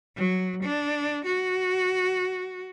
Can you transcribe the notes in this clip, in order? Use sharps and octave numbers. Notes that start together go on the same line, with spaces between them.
F#3
D4
F#4